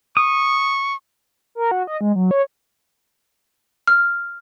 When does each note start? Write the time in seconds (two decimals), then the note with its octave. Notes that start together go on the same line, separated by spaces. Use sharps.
0.17 C#6 D#6
1.55 A#4
1.71 F#4
1.87 D#5
2.01 G#3
2.15 F#3
2.31 C#5
3.87 F6